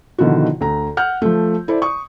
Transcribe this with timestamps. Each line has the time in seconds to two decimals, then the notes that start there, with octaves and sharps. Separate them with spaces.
0.18 B2 D3 D#3 F3 E4 F#4
0.61 D2 A#5
0.97 F#5 F6 G6
1.22 F3 A3
1.68 E4 A4 C5 D5
1.82 C#6 D#6